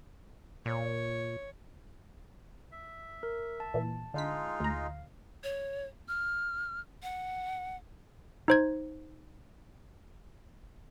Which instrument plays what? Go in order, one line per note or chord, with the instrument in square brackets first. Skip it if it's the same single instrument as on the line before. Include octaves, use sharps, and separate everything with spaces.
[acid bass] A#2 [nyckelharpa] C#5
[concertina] E5
[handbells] A#4
A5
[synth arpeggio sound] A#2 E3
[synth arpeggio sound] D3 B6 [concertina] G#3 D#4 F4
[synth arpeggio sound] D2 A#5 [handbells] F5
[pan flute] C#5
F6
F#5
[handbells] D#4 C5 G#6